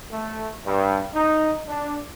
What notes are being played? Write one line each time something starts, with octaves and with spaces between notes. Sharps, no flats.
A3
G2
D#4
D4